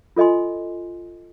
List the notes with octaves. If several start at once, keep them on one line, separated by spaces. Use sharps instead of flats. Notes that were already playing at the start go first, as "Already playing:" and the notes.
F4 A4 D#5 G#5 C6